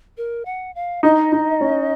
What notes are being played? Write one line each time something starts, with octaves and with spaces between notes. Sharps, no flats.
A#4
F#5
F5
D#4 D#5
D#4
C#4